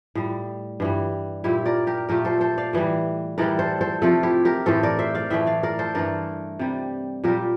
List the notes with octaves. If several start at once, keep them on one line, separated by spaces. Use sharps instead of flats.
A2 G3
G2 E3 G3
A#2 G3 E4 G4
A#4 D5
G4 A#4
A#2 A3 G4 A#4
A4 C5
A4 C5
D5 F5
A2 E3 G3
A2 E3 G3 A#4 D5
A4 C5
A4 C5
C3 F3 A3 F4 A4
E4 G4
G4 A#4
A2 E3 A3 A4 C5
A#4 D5
C5 E5
D5 F5
A2 E3 A3 E5 G5
D5 F5
A#4 D5
A4 C5
G2 E3 A3 A#4 D5
C3 G3
A#2 G3 G4 A#4